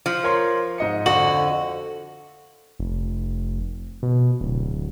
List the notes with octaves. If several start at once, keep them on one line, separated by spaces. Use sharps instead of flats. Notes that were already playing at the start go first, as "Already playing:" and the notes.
F3
A#4 C#5 C6
G#2 D#5 C#7
F2 D3 F#4 F#7
F1
B2
D1